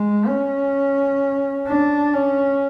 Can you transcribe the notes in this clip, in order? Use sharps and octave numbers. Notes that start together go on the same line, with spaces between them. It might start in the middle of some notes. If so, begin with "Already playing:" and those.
Already playing: G#3
C#4
D4
C#4